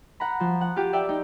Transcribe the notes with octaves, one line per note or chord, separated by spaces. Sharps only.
F#5 A#5 B5
F3
F#5
F4 G4
D5 E5 G5
D#4